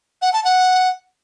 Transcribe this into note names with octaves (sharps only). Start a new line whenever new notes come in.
F#5
A5
F#5